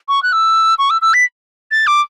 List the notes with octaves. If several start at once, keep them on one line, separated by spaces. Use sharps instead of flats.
C#6
F#6
E6
C#6
E6
E6
B6
A6
D6